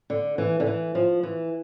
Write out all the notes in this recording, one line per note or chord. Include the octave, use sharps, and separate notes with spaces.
D3
E3
D3
E3
F3
E3